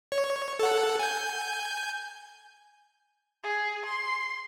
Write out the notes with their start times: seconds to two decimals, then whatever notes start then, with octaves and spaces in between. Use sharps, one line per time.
0.12 C#5
0.59 A4 F#5
0.99 G#5 G6
3.43 G#4
3.85 C6